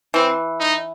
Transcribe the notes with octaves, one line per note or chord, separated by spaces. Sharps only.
E3 C4
D#4